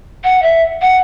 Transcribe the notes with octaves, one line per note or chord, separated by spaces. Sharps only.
F#5
E5
F#5